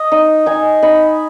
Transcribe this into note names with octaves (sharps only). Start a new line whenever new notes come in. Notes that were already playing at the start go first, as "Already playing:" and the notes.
Already playing: D#5
D#4
D#4 G#5
D#4 B5